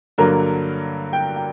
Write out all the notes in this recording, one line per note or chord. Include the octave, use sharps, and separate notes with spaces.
G2 D3 F#3 A#3 A#4
G5
G5